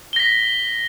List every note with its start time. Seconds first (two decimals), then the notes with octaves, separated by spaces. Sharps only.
0.13 G7
0.16 A#6
0.20 B6